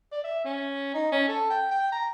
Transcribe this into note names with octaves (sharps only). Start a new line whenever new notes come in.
D5
E5
C#4
D#4
C#4
A4
G5
G5
A#5